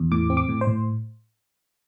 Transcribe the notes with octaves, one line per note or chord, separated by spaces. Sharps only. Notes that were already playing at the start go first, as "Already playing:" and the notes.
Already playing: E2
A2 D6
C4
D6
A2
C5
A2